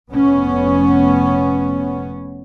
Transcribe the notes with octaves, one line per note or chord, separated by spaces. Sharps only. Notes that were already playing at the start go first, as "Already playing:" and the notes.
F1 B3 C#4